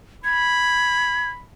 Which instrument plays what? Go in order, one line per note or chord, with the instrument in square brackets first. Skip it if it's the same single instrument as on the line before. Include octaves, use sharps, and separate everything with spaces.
[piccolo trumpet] B5 [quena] G#6